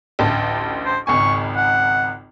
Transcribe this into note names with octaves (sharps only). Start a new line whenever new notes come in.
A1 D2 A5
C5
G#1 C#2 G#5 C#6
F#5